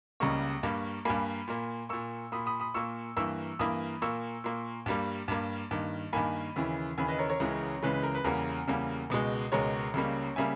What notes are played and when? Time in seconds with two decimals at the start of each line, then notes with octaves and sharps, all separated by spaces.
0.20 C#2 C#3 G3 A#3 A#5 C#6
0.63 G2 G3 A#3
1.05 G2 G3 A#3 G#5 B5
1.48 A#2 A#3
1.89 A#2 A#3 C#6 E6
2.32 A#2 A#3 B5 D#6
2.46 B5 D#6
2.60 B5 D#6
2.74 A#2 A#3 C#6 E6
3.16 G2 E3 A#3 C#6 E6
3.59 G2 E3 A#3 B5 D#6
4.02 A#2 A#3 C#6 E6
4.44 A#2 A#3
4.86 G2 G3 A#3
5.28 G2 G3 A#3
5.71 G2 D#3 A#3
6.13 G2 D#3 A#3 G#5 B5
6.56 D#2 C#3 E3
6.98 D#2 C#3 E3 G#5 B5
7.08 B4 D#5
7.19 A#4 C#5
7.30 A#4 C#5
7.40 C#2 C#3 E3 G#3
7.83 C#2 C#3 E3 G#3 B4
7.93 B4
8.03 A#4
8.14 B4
8.24 E2 C#3 G3 A#3 A#4
8.67 E2 C#3 G3 A#3
9.10 C#2 B2 G#3
9.52 C#2 B2 G#3 A#4 C#5
9.94 C#2 C#3 G3 A#3
10.36 C#3 G3 A#3 E5 G#5